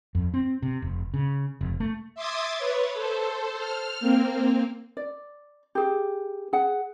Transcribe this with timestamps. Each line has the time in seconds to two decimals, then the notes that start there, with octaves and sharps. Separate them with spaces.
0.15 F2
0.34 C4
0.62 C3
0.82 F1
1.14 C#3
1.61 F1
1.80 A3
2.15 E5 C6 D6 D#6 G#6 A6
2.58 B4 C#5
2.94 A4 C5
3.59 F6
4.00 A#3 C4
4.97 D5
5.75 G4 G#4
6.53 G#4 F#5